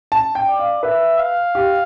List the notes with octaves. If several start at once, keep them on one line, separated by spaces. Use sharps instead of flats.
A5
G5
D5
F5
B4 E5
F5
G4